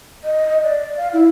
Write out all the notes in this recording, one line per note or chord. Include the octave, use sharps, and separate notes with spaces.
D#5
D5
F5
E4